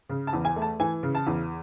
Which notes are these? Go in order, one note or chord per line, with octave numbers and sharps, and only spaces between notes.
C#3
A5
E2
G#5
A3
A5
E3 G#5
C#3
A5
E2